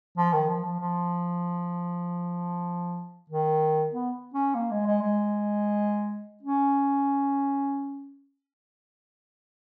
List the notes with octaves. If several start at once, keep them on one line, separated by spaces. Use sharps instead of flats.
F3
D#3
F3
F3
F3
D#3
B3
C#4
A#3
G#3
G#3
G#3
C#4